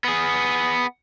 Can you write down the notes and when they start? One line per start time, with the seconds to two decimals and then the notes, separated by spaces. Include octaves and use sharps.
0.04 B3 G#4